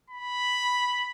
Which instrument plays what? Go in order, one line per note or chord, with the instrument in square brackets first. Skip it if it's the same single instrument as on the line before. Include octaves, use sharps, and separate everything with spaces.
[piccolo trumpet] B5